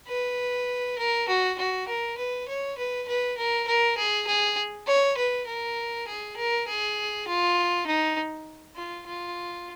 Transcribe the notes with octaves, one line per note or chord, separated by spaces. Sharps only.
B4
A#4
F#4
F#4
A#4
B4
C#5
B4
B4
A#4
A#4
G#4
G#4
C#5
B4
A#4
G#4
A#4
G#4
F4
D#4
F4
F4